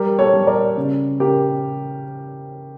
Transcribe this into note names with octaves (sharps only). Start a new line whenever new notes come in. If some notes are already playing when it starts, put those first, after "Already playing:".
Already playing: G3 G4 A#4
A4 C#5
G3
A#4 D5
C#3
C#3 G4 A#4